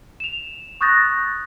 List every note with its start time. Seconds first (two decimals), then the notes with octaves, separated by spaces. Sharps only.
0.20 E7 F7
0.81 C#6 D#6 F#6 G6 A6 A#6